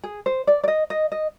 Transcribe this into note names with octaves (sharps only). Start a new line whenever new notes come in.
G#4
C5
D5
D5
D#5
D#5
D#5